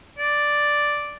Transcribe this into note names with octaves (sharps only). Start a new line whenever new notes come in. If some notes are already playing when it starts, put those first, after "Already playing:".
D5